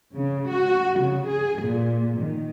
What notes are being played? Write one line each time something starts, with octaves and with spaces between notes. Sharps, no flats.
C#3
F#4
C#3
G#4
A#2
D#3